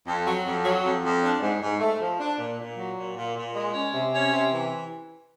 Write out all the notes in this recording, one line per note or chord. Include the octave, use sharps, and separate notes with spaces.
F2
F#3
F2
F#3
F2
F2
D4
G#2
G#2
A3
F3
D4
A#2
A#2
F#3
A#2
A#2
A#2
G#3
C#4
C3
C#4
C3
E3